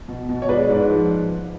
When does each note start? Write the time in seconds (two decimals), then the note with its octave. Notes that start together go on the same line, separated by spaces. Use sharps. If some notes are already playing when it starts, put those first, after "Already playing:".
0.08 B2
0.29 B2
0.42 C#5
0.49 G#3 B4 D5
0.69 G#2
0.89 F3